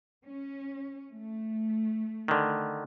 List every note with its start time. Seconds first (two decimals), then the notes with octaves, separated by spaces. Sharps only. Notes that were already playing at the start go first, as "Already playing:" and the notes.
0.23 C#4
1.15 A3
2.28 D3 D#3